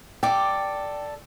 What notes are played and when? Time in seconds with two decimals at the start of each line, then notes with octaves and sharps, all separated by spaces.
0.23 A4 D5 G5 D6